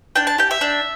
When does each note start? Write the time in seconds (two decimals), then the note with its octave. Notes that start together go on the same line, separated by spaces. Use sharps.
0.16 D4 G5
0.27 A5
0.38 G4 G5
0.51 E5
0.61 D4